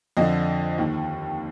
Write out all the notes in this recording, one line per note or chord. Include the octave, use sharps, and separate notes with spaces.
F2 D3 F3 D#5
D#2 D#3